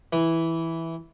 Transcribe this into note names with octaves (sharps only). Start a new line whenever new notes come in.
E3